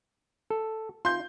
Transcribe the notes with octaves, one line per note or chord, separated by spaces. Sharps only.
A4
F4 C6 G6